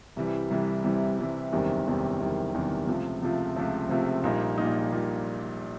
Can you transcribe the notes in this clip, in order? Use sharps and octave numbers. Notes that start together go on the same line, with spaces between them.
C2 C3 E3 G3
C2 C3 E3 G3
C2 C3 E3 G3
C2 C3 E3 G3
F#1 E2 C3 D#3 G3
F#1 E2 C3 D#3 G3
F#1 E2 C3 D#3 G3
F#1 E2 C3 D#3 G3
C#2 C3 F3 A3
C#2 C3 F3 A3
C#2 C3 F3 A3
C#2 C3 F3 A3
A#1 A#2 G3 A#3 D#4
A#1 A#2 G3 A#3 D#4
A#2 G3